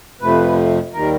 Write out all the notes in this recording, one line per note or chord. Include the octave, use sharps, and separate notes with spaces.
F2 C3 F3 A3 B4
D#2 D#3 G3 A#4